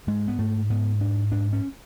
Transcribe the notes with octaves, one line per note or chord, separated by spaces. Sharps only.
G#2 G#3
B3
G#2 A3
G#2 B3
G#2 D4
G#2 D4
C#4